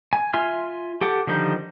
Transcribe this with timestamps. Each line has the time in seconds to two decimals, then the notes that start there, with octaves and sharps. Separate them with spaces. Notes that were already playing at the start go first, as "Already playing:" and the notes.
0.13 G#5
0.33 F4 E5 G#5 C6 F6
1.01 G4 A4 F#5 D6
1.27 D3 D#3 F3 G3 D#4